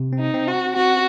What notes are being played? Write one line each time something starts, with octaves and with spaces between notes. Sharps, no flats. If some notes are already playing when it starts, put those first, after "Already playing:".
Already playing: C3
C4
D#4
C4
F#4
C4
C4 F#4